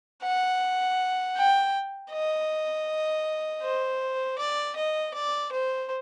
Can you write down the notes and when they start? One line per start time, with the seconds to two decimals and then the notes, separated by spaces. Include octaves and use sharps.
0.22 F#5
1.36 G5
2.11 D#5
3.63 C5
4.38 D5
4.76 D#5
5.14 D5
5.52 C5